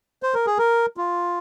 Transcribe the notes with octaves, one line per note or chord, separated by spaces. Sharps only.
C5
A#4
G#4
A#4
F4